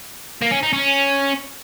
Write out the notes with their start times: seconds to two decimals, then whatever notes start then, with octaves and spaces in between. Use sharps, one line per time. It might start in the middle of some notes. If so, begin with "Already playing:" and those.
0.41 A#3
0.51 C#4
0.63 D#4
0.73 C#4